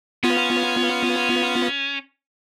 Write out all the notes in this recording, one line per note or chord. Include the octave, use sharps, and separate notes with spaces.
B3 C#4 F4